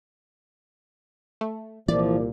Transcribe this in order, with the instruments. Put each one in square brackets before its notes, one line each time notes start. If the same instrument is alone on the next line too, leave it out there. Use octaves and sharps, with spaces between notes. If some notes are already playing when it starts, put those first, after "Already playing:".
[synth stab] A3
[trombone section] C2 A#2 [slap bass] E3 [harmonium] F3 [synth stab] D5